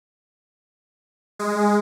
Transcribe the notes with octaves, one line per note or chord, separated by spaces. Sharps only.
G#3